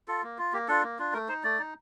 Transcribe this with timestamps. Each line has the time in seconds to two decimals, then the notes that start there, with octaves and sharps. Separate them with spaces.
0.08 F4 A4
0.23 A#3
0.38 F4
0.53 A#3 G4
0.68 D4 F4 A4
0.83 A#3
0.99 D4 F4
1.13 A3 A#4
1.29 D#4 C5
1.44 A3 D5
1.59 D#4